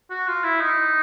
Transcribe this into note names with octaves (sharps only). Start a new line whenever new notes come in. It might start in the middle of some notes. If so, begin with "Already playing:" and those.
F#4
F4
E4
D#4